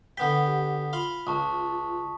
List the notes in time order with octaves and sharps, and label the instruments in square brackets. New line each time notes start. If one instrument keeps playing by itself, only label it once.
[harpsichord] D3 B3 G5 [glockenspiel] B6
[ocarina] G4
[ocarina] F4 [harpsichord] F5 B5 C6
[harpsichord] C#2 [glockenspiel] A5 C#6 D#6